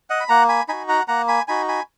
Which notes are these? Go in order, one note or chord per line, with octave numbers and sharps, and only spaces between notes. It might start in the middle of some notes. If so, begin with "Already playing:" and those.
D#5 F#5
B5
A#3 F#5 A#5
G#5 B5
D#4 F#4 G#5 B5
F#5 A#5
A#3 F#5 A#5
G#5 B5
D#4 F#4 G#5 B5
G#5 B5